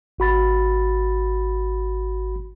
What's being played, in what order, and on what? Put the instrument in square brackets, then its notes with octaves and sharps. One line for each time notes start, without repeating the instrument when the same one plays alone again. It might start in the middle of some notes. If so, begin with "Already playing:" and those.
[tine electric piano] G#1 F#4 B5 A6